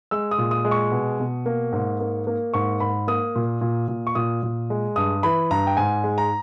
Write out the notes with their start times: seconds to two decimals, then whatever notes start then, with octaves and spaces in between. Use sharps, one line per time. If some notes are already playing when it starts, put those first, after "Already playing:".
0.11 G#3 E6
0.31 D#6
0.38 A#2
0.51 D#6
0.65 G#3
0.71 C#6
0.92 B2
1.20 B2
1.46 A#3
1.73 G#2
2.00 A#3
2.27 A#3
2.54 G#2 C#6
2.80 G#2 B5
3.08 A#3 D#6
3.35 A#2
3.61 A#2
3.88 A#2
4.07 C#6
4.15 A#2 D#6
4.43 A#2
4.70 G#3
4.96 G2 D#6
5.23 E3 B5
5.51 G2 A#5
5.67 G5
5.77 G#2 G#5
6.04 G#3
6.18 A#5